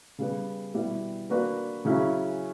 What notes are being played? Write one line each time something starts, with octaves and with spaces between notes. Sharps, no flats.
C#3 G3 B3
B2 G3 B3 E4
A#3 D4 F#4 B4
C#3 F#3 C#4 E4